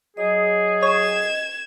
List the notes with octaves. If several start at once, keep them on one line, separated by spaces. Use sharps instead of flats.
F#3 G#4 D#5
C#5 G#6 E7